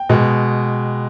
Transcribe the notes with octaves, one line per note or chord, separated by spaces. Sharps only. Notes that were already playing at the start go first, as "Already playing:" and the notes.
Already playing: G5
B2 G#3